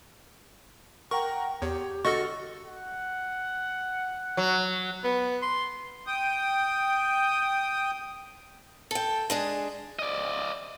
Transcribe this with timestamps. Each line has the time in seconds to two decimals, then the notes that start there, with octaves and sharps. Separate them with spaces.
1.11 A#4 F#5 G5 A#5 C#6
1.62 E2 G4 C#5
2.05 D3 F#4 A4 D#5 C#6 F6 A6
2.65 F#5
4.37 F#3
5.04 B3
5.42 C6
6.07 G5 D#6
8.91 A4 G5
9.30 G#3 D4 G#4
9.99 D5 D#5